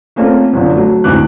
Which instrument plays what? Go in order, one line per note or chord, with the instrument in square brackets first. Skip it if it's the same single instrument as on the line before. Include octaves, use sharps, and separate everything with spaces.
[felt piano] A3 A#3 C4 C#4 F4 A4
G1 F#2 D3
F#3 A3
D2 G#2 E3 D6 F#6